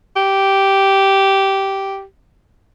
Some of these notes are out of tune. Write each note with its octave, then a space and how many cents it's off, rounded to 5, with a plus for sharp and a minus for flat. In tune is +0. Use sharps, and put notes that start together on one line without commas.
G4 -10